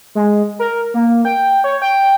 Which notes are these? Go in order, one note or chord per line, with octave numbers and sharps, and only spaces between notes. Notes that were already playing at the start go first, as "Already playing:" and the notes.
G#3
A#4
A#3
G5
C#5
G5